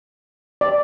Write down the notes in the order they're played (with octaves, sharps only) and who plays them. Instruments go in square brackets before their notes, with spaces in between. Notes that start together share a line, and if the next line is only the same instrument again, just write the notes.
[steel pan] D5